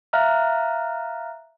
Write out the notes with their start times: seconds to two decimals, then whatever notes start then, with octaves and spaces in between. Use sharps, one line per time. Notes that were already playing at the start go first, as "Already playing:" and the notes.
0.13 E5 F5 A#5 F6 F#6